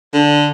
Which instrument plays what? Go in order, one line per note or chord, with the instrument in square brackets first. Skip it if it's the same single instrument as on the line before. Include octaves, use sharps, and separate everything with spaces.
[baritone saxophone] D3